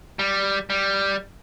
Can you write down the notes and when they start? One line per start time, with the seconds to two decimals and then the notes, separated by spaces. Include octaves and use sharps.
0.19 G3
0.70 G3